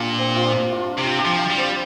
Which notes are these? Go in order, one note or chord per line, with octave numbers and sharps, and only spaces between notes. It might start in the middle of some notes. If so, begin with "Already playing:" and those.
Already playing: A#2 D4 F4 G4 A#4
C4
F4
D4
F4
C3 G4
G4
F3
F4
G3
C4